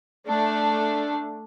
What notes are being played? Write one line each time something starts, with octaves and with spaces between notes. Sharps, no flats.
A3 D4